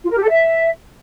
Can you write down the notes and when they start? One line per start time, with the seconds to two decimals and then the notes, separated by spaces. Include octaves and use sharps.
0.03 F4
0.09 A#4
0.16 G4
0.22 A4
0.29 E5